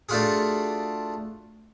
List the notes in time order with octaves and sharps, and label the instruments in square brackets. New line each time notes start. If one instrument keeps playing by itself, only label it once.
[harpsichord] A3 D4 F4 F#4 G#4